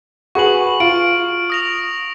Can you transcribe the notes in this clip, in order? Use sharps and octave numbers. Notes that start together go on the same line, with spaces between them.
F#4 G#4 B4 C#6 F#7
F4 D7
D#6 A#6 F7